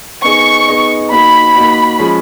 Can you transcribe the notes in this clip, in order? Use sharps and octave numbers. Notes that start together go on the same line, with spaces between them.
B3 D#4 G#4 D#5 C#6
B3 D#4 G#4 D#5
A#3 D#4 F#4 B5
A#3 D#4 F#4
F3 G#3 C#4